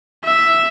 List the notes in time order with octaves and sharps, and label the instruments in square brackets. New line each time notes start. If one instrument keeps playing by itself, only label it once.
[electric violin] E5